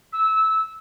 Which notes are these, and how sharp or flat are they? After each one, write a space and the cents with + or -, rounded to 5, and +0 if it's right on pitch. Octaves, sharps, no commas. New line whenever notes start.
E6 -20